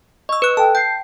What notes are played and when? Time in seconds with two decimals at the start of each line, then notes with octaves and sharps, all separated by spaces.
0.29 D#5 C#6 E6
0.42 B4 F#6
0.57 A4 G5 A5
0.75 G5 G6 C7